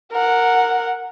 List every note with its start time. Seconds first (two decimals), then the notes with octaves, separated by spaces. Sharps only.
0.12 A#4 F#5